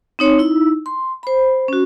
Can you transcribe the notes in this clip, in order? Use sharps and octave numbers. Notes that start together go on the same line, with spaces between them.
C4 D#4 C#5 C6
D#4 E4 E6
C6
C5 B5
C#4 F#4